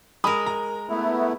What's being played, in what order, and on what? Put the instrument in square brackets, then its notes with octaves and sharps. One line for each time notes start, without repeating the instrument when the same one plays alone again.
[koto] G#3 A#4 [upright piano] B5 D#6
[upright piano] A#5
[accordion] A3 B3 E4